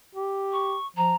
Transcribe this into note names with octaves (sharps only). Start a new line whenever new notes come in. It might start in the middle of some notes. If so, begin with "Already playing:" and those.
G4
C#6
F3 A#5